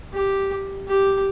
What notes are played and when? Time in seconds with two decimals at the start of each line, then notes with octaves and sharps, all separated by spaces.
0.13 G4
0.87 G4